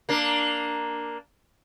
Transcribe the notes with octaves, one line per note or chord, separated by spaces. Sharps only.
A#3 D4